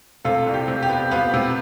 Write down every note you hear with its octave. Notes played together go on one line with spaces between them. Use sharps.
C3 F4 A4
C2
G4
C3
G4
B3
B3 F4
C3